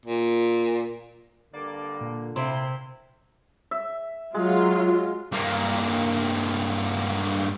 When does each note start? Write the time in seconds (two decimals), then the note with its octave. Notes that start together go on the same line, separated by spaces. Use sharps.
0.05 A#2
1.54 G2 D3 A#3 D5
2.01 A#2
2.36 C3 A#3 E4 C6
3.71 E5
4.34 F#3 G#3 F4
5.32 G2 A#3